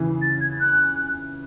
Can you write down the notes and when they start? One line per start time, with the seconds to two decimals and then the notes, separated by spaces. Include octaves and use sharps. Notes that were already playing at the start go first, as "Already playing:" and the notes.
Already playing: C#3 E3
0.21 A6
0.41 G#6
0.60 F#6